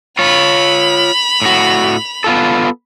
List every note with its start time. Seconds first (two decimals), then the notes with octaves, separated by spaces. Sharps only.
0.19 F4 C#5 B5 F7
1.42 A2 F#4
2.24 B3 F4 A4